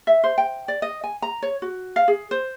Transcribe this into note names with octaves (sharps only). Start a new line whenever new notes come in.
E5
C5
G5
D5
D#5
G#5
A#5
C#5
F#4
F5
G#4
C5